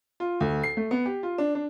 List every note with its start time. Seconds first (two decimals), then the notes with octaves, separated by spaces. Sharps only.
0.20 F4
0.40 D2
0.63 C7
0.77 A3
0.91 B3
1.06 G4
1.23 F4
1.38 D4
1.55 D4